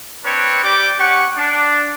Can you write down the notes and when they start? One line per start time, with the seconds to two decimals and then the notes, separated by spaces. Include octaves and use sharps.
0.25 C4 D4 B4 C#5
0.63 G3 G4 D5 G5 D6
0.98 C#4 G4 F#5 C#6
1.37 D4